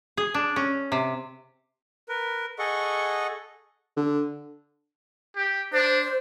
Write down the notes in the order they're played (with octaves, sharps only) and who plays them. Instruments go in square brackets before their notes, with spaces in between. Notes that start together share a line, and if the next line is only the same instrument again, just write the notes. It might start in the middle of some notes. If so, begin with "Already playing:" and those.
[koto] G#4
D4
C#4
C3
[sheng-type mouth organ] A#4 B4
G#4 A4 D#5 F#5 C#6
[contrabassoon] D3
[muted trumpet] G4
[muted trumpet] D4 [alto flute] C5